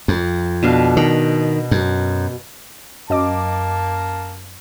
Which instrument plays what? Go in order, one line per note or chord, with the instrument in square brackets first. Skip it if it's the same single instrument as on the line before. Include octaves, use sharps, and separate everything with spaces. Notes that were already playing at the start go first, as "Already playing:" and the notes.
[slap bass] F2
[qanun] B2 D4 F5
[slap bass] D#3
F#2
[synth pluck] F#2 D#5 D6 [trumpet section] A#3 A5